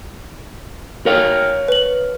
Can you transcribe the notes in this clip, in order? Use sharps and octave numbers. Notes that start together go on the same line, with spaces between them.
A#4 C#5 F5
B4 F#7